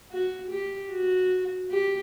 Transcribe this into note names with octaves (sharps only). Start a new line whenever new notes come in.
F#4
G4
F#4
G4